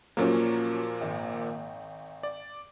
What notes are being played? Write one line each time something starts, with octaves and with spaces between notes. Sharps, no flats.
A#2 F3 F#3 A#3 C#4
G#1
D5